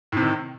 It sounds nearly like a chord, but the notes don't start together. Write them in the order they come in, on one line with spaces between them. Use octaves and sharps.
A2 C3 D#3